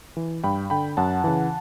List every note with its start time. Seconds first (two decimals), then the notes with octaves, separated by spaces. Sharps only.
0.17 E3
0.43 G2 G5 B5
0.70 D3 G5 B5
0.97 F#2 F#5 A5
1.24 C#3 E3